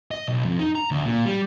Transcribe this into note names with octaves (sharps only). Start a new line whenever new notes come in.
D#5
B1
F2
D#4
A#5
D2
A#2
G3